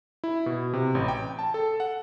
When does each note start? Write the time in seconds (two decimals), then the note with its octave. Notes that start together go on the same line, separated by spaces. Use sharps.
0.24 E4
0.46 B2
0.73 C3
0.95 A1
1.08 G5
1.39 A5
1.54 A4
1.80 F#5